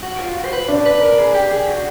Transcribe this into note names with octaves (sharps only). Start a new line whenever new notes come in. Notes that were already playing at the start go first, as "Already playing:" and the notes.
F#4
F4
F#4
C5
B4
D4
B4
A#4
G#4
G4
G#4
F#4